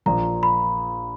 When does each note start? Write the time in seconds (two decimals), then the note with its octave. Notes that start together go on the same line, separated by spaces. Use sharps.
0.06 A#1 A#2 F3 A#5
0.43 B5